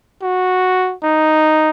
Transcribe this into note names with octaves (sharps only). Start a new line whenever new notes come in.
F#4
D#4